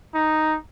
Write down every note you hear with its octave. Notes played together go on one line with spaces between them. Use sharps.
D#4